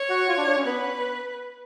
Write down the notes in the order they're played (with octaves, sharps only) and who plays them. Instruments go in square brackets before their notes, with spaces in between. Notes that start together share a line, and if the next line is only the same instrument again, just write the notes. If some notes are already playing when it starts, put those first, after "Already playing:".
Already playing: [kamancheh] C#5
[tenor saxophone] F#4
F4
D4
D4
C#4
[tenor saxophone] B3 [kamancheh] B4